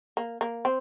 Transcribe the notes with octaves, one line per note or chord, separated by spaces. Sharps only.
A#3
A#3
C4